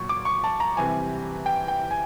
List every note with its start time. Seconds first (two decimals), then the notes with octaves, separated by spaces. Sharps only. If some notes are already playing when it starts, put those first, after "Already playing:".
Already playing: A#2 F#3 C#6
0.09 D6
0.25 C#6
0.44 A5
0.60 A#5
0.77 C3 E3 G3 G#5
1.46 G5
1.68 G5
1.91 G#5